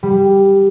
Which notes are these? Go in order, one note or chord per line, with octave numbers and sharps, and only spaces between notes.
G3